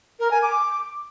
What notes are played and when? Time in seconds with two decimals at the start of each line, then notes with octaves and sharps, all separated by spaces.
0.20 A#4
0.31 G#5
0.42 D6